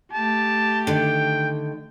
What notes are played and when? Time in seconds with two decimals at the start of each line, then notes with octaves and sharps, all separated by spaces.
0.13 A3 G4 A5
0.87 D3 D#3 G5